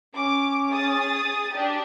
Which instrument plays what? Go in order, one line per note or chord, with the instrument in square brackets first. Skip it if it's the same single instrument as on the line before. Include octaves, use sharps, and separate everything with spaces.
[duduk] C#4 [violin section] D6
[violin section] G#4 D#6 A6
D4 G4